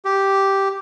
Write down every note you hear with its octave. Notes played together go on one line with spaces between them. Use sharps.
G4